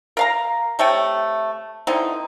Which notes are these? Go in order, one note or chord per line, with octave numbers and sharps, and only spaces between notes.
A#4 F5 A#5
C3 A3 C#5 G5
D3 E3 C4 D#4